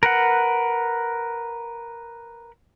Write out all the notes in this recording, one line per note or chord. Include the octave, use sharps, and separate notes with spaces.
A#4 B4 F#5